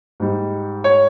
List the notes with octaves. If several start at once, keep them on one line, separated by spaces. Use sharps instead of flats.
G#2 G3
C#5